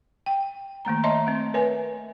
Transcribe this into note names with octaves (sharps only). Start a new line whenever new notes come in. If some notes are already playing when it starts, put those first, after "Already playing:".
G5
D#3 A3 A#3 A#5
C#5 D#5 E5 A5 A#5 C6
A3 C4
A#4 B4 C#5 E5 G#5